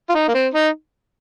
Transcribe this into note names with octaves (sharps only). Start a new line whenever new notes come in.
F4
D#4
A#3
C4
D#4